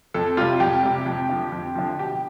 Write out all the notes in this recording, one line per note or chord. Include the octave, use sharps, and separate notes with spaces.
F2 A4
C3 G3 F4
F2 G4
C3 G3
F2
D3 F3
F2
D3 F3
B2 G4